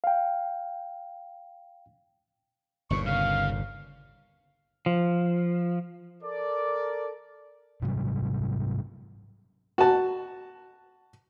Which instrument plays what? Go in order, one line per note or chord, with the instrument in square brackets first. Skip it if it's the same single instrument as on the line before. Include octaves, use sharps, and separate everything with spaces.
[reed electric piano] F5 G5
[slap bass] G1 D#2 A#2 [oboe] C#6
[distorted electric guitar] C#3 [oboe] F5
[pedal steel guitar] F3
[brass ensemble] A4 A#4 D5
[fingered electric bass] G#2 C3 F#3 G3
[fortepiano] F#4 A5